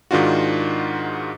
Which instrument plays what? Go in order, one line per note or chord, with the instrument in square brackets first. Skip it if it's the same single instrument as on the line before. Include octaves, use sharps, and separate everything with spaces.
[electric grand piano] G#2 D#3 D4 F4 F#4